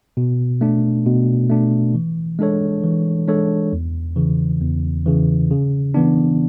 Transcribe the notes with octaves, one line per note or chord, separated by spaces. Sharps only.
B2
A3 D4
B2
A3 D4
E3
G#3 D4 A4 C#5
E3
G#3 D4 A4 C#5
E2
C#3 E3
E2
C#3 E3
C#3
E3 B3 D4